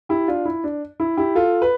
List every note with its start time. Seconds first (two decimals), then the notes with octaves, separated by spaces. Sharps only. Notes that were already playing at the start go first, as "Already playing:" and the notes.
0.09 E4 G4
0.28 D4 F4
0.45 E4
0.64 D4
1.00 E4
1.17 E4 G4
1.35 F4 A4
1.62 B4